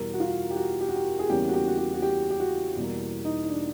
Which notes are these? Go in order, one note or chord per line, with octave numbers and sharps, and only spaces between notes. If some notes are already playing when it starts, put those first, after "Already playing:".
Already playing: E2 B2 G3 A#4
F#4
F4
G4
F#4
G4
F#4
G4
G#4
E2 C#3 E3 G3 A#3 G4
F#4
G4
F#4
G4
F#4
G4
G4
F#4
E2 B2 G3 A#3
D#4
D#4
D4